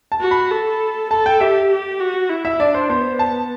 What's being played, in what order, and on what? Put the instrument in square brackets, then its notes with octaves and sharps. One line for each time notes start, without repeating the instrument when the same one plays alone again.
[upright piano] A5
[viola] F#4
[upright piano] B5
[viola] A4
[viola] A4 [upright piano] A5
[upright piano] G5
[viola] G4 [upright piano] E5
[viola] G4
F#4
E4
[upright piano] E5
[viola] D4 [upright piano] D5
[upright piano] C5
[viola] B3 [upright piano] C5
[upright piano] A5